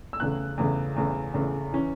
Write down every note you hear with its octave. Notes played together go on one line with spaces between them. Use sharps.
E6
E2 C#3 A3 F#6
E2 C#3 A3
E2 C#3 A3
E2 C#3 A3
E3 C#4